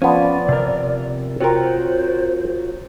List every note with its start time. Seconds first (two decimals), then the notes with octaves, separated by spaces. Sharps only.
0.02 F3 B3 C#4 D5
0.49 C3 A#4
1.41 C4 F4 F#4 A#4 C5 C#5